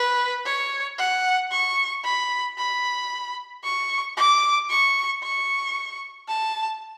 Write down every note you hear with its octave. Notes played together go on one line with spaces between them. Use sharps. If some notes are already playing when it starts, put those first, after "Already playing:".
Already playing: B4
C#5
F#5
C#6
B5
B5
C#6
D6
C#6
C#6
A5